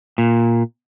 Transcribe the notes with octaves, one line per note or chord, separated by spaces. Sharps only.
A#2